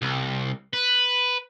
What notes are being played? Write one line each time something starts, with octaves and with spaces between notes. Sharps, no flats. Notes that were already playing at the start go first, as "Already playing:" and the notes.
C2
B4